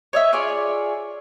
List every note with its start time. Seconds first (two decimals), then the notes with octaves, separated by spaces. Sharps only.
0.13 C#5 D#5 E5
0.33 F4 G#4 C#5 D5